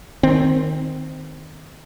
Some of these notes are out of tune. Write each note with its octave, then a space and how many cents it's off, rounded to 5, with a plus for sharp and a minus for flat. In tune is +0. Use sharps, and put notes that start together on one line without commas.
D#3 +0 C4 -15